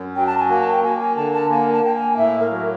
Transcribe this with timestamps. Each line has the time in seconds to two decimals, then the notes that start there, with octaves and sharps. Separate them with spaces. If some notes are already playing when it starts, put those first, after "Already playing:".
Already playing: F#2
0.16 F#3 G5
0.27 A5
0.38 A5
0.41 G#5
0.49 A#3
0.60 A5
0.72 G5
0.83 A#3 G#5
0.99 G#5
1.16 D3 A5
1.33 A5
1.50 A#3 G#5
1.73 A5
1.83 A#3 G5
1.95 G#5
2.17 A2 E5
2.40 A#4
2.51 F#3